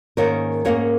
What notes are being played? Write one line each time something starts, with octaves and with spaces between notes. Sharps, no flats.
G#2 D#3 A#3 C#4 A#4 C#5
G#2 D#3 A#3 C#4 A#4 C#5